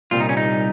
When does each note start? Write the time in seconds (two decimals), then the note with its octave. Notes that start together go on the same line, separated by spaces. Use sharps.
0.11 C2 A#2 G3 F4
0.20 D#4
0.29 C#4
0.37 D#4